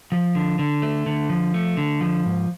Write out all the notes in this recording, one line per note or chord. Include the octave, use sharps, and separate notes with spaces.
F3
D3
D3
A3
D3
F3
A3
D3
F3
G#2